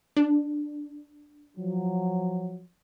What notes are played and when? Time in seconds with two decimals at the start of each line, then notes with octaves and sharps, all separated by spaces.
0.17 D4
1.58 F3 F#3